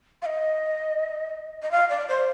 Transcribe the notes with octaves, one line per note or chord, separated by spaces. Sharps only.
F5
D#5
D#5
F5
D5
C5